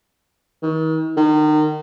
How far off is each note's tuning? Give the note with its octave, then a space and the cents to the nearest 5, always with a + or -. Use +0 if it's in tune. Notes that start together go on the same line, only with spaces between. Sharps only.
D#3 +40
D#3 -30